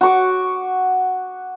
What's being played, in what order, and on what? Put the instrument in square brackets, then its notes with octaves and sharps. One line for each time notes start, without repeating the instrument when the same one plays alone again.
[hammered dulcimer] F#4 C#6 D6